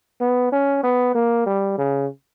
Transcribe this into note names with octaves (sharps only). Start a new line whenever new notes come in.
B3
C#4
B3
A#3
G3
C#3